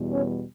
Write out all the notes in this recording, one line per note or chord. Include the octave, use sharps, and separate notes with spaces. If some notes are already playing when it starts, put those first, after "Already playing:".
Already playing: E2 B2 G3
C#4 C#5